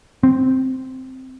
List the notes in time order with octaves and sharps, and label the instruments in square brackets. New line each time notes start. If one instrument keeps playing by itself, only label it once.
[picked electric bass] C4